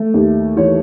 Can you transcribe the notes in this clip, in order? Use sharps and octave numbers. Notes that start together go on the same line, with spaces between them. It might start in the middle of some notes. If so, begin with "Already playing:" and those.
Already playing: A3
D#2
E3 C#5